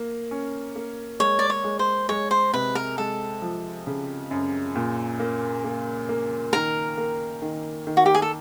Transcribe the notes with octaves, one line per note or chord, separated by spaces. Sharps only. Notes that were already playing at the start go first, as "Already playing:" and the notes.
Already playing: A#3
C#4
A#3
G#3 C#5
D5
C#5
G#3
C5
G#3 C#5
C5
C3 B4
A#4
G#3 A4
F3
C#3
F#2
A#2
A#3
A#3
A#3
D#3 A#4
A#3
D#3
D#3
F#4
G4
G#4
A4